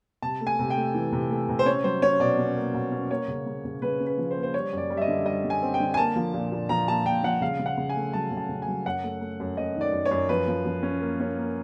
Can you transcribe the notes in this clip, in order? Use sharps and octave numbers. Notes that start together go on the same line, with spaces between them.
C3 A5
A3
G#5
C3
G5
A3
E3
C3
A3
C3
C5
C#4 C#5
F#3 C5
C#4 C#5
B2 D5
C#4
A#3
B2
C#4
A#3 C#5
C#3
C#3
C#3
C#3 B4
C#4
B4
F3
C5
A#3
C5
G3 C#5
F#2 D5
G3
E5
D#5
D3
G3 D#5
D3
G#5
C4
G5
D3
G#5
A#3 A5
F3
A#2
A#2
F3 A#5
A#2 A5
A#2 G5
F3 F#5
C#3 F5
C#3
F#5
C#3
G#5
A3
F#3 A5
C#3
A5
C#3
G#5
F#3
F#2 F#5
A3
A3
F#2
F#2 D#5
D#3
D5
F#2
C#5
F#2
F3 B4
F3
F3
C#4
A#3
C#4
A#3